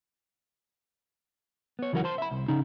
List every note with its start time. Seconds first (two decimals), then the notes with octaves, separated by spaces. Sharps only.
1.79 B3 C#5
1.92 C#2 E3 F#3 D4 A#4 F#5
2.04 C5 A5 C6
2.18 E5 B5
2.31 C2
2.48 C#3 C#4 D#4